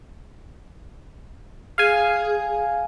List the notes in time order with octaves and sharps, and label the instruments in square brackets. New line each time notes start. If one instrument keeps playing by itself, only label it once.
[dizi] G#4 [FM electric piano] F5 G#5